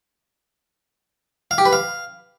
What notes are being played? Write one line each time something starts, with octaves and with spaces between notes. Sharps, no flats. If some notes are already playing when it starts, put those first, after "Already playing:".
F5
G4
B4
F5